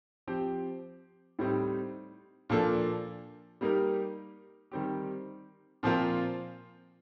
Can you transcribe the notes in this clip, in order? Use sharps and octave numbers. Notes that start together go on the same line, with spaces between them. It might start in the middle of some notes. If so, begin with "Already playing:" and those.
F3 C4 G4
A2 G3 C4 D#4
A#2 F3 A#3 D4 A4
G3 A#3 D#4 G4 A#4
D#3 G3 C4 G4
A#2 F3 C4 F4 A#4